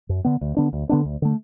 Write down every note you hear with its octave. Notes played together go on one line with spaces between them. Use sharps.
F#2
D3 B3
D2
D3 B3 D4
D2
D3 B3 D4
D2
D3 A3